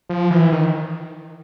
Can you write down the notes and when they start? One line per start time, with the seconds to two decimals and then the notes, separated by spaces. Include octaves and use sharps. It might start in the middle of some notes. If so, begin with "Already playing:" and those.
0.09 F3
0.31 E3
0.52 D#3